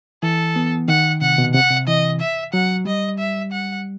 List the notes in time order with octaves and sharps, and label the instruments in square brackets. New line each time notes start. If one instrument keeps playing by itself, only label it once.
[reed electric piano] E3 [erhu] A4
[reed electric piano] B3
[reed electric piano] D#3 [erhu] F#5
[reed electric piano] C3 [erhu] F#5
[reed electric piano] B2
[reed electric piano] C3 [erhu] F#5
[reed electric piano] C3
[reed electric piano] E3 [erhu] D#5
[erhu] E5
[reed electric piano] F#3 [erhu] F#5
[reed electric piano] G3 [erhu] D#5
[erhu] E5
F#5